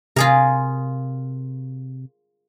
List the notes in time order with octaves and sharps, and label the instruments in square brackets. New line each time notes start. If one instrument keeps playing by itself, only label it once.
[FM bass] C3 [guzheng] F4 G#4 A#4